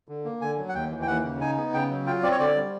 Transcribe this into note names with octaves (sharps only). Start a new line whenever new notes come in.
D3
A#3
D3 G#5
F#3
F#5
D#2 G5
E3
G5
D#2 F#5
C#3
D#4 G#5
B3
C#3 G5
F#3
F4 G5
C4 D5
C#5
D3 D5
G3